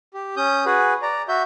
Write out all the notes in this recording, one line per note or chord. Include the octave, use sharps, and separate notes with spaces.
G4
C#4 D#6 G6
F#4 G#4 B4
D5 A#5
F#4 E5 G6